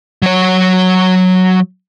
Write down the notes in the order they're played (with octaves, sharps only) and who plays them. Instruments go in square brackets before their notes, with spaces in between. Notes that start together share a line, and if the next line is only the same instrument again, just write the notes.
[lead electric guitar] F#3 C#5